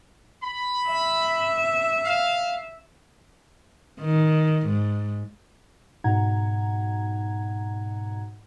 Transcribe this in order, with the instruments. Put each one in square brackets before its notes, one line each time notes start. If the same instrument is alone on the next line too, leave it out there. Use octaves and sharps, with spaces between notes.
[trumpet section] B5
[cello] E5
[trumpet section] F5
[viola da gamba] D#3
G#2
[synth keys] G#2 B2 D#4 F#5 A#5 G#6